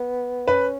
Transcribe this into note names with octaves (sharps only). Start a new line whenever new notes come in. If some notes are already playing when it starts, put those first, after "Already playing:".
Already playing: B3
C#4 B4